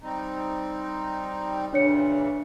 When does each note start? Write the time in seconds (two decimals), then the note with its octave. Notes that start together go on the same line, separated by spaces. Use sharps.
0.02 G3 C4 D#4
1.73 A#2 C#3 E3 D4 C#5 C#7